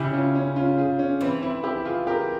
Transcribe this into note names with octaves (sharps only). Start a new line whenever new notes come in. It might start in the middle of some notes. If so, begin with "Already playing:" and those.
Already playing: C#3 E4 G4
C#4 F4
C#4
C#4 F4
F4 G#4
C#4
E3 C4
C4 E4
E4 G4
F4 G#4
G4 A#4